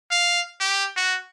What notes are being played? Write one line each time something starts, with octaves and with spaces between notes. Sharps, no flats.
F5
G4
F#4